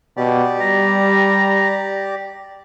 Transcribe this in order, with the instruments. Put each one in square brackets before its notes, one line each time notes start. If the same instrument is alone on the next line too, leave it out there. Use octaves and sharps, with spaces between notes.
[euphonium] B2 [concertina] G4 D5
[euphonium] G3 [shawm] A#5